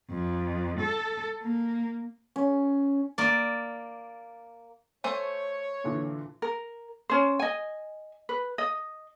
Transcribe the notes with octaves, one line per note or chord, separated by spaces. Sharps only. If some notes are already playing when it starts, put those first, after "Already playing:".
F2
A4
A#3
C#4
A#3 D5
A3 C5 C#5 G#5
A#2 D3 E3
A#4
C#4 C5
D#5 G#5
B4
D#5